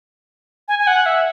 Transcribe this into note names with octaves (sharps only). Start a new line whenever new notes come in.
G#5
G#5
F#5
E5